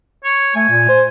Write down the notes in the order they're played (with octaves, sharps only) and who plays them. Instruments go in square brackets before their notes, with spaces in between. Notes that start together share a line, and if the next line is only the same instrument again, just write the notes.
[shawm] C#5
[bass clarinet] A3 [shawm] G#5
[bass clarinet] A#2
C5